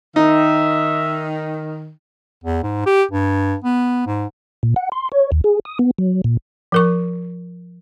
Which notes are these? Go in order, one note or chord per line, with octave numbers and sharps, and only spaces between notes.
D#3 D#4 E5
E2
G#2
G4
G2
B3
G#2
A#2
F#5
C6
C#5
D#2
G#4
D#6
B3
F#3
A#2
F3 A#4 C#6